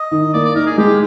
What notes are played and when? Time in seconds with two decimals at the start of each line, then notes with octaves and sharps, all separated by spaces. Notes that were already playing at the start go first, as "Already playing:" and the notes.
Already playing: D#5
0.11 D#3
0.34 A#3 D5
0.45 D5
0.56 D#4 A#4
0.66 G#4
0.78 G#3 G4